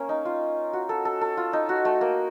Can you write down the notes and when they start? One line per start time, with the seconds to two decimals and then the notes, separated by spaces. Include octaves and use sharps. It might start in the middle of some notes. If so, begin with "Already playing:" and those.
Already playing: A#3 C#4
0.09 D#4
0.25 F4
0.73 F#4
0.89 A4
1.05 A4
1.21 A4
1.37 F4
1.53 D#4
1.69 F#4
1.85 A3
2.01 A#3